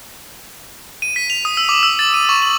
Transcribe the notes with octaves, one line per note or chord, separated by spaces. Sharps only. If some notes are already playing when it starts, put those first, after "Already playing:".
D#7
B6
F7
D#6
E6
D6
E6
A6
D#7
C#6
F#7